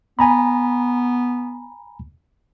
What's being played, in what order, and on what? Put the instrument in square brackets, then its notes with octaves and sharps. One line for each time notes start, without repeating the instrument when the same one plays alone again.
[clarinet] B3 [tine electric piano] G#5 A#5 B5